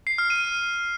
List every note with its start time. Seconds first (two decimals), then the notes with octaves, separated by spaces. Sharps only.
0.07 C7
0.18 F6
0.30 D#7